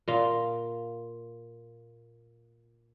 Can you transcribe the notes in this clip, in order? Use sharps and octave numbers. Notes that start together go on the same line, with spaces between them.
A#2 F4